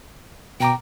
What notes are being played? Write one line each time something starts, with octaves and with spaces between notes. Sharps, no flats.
B2 G5 A#5 D6